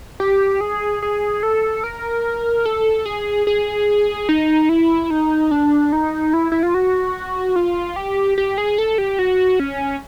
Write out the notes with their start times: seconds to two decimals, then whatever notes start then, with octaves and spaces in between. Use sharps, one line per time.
0.20 G4
0.61 G#4
1.02 G#4
1.43 A4
1.84 A#4
2.65 A4
3.06 G#4
3.47 G#4
4.29 D#4
4.69 E4
5.10 D#4
5.51 D4
5.92 D#4
6.33 E4
6.52 E4
6.63 F4
6.74 F#4
7.56 F4
7.96 G4
8.38 G4
8.58 G#4
8.78 A4
8.98 G4
9.19 F#4
9.60 C#4